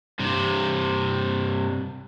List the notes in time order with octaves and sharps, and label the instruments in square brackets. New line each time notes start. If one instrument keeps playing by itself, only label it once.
[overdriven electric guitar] G2 C3